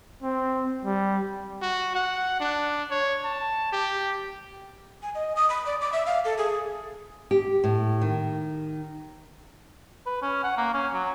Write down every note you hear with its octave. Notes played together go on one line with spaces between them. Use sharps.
C4
G3
F#4
F#5
D4
C#5
A5
G4
G#5
D#5
D#6
B5
D5
D6
E5
F5
A4
G#4
G4
A2
D#3
B4
C#4
F#5
A#3
C#4
F#3